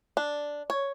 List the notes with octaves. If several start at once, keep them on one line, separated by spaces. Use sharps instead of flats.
D4
C#5